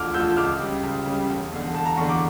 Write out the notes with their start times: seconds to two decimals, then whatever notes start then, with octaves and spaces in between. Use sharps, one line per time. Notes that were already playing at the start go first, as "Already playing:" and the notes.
Already playing: E1 D2 D3 F3 D6 F6
0.14 D2 D3 F3 E6 G6
0.37 C#2 D6 F6
0.60 C#3 G3
0.83 C#2
1.06 C#3 G3
1.29 E1
1.52 E2 D3
1.74 E1 A5
1.86 A#5
1.97 E2 D3 C#6
2.09 D6